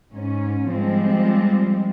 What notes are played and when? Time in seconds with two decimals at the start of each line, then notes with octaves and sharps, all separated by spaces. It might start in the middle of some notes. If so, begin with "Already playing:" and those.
0.12 G#2 C#4
0.70 F3 G3 G#3 C4